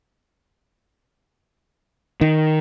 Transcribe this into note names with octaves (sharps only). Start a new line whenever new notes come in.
D#3